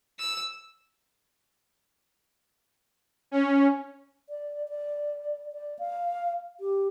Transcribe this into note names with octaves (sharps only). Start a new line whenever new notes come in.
E6
C#4
D5
D5
D5
F5
G4